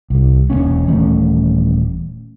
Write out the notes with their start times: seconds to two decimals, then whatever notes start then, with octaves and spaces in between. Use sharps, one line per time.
0.10 C2
0.50 E1 A2 A#3 C#4
0.87 D#1 E3 A3 C#4